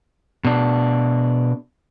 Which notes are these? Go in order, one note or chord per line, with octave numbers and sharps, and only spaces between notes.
B2 D4